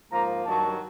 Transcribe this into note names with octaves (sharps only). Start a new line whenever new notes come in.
G#2 F3 A#3 A#5
G2 D#3 F#3 A5